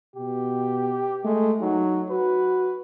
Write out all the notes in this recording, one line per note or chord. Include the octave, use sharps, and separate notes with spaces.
B2 G4
G#3 A3
F#3 D#4
F#4 B4